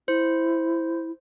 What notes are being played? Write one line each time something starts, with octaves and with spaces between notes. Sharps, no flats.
E4 C5